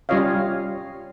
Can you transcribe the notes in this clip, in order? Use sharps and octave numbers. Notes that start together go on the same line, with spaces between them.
G3 C#4 F4 C#5 D#5 F5